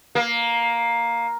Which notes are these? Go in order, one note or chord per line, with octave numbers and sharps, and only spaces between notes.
A#3